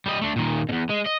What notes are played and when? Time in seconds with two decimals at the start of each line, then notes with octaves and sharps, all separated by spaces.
0.06 G3 D#5
0.22 A3 D4
0.36 A#2 D#3
0.69 E2 B2
0.89 G#3
1.06 D#5